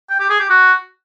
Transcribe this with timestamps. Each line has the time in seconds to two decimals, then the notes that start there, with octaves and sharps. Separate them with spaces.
0.10 G5
0.20 G4
0.30 G#4
0.40 G4
0.50 F#4